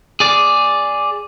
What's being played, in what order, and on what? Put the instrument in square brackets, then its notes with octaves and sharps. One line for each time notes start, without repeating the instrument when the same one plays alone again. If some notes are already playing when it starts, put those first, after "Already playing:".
[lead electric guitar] G#4 D5